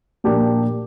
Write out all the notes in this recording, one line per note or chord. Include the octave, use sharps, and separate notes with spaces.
A#2 F3 A#3 D4 G4